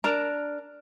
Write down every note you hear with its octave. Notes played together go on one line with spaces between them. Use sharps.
D4 A#4 A#5